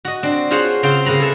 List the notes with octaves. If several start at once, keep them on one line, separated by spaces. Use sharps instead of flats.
F#4 D#5
C4 D4
F4 F#4 G#4 C5 C#5 F#5
C#3 C4 F5 G5 C6
C#3 A#3 B4 A#5 B5
G#4 A4 E5